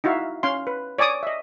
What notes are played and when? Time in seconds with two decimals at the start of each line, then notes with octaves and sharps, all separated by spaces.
0.04 D#4 E4 F#4 E5 F5
0.43 C#4 F5 C6
0.67 B4
0.98 C#5 D5 G#5 D6 D#6
1.23 D#5 E5